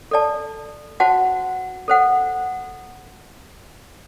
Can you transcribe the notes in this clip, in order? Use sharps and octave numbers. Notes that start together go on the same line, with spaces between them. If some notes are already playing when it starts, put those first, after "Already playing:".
A4 D5 A5
F#4 C5 F#5 A5
A4 C5 F#5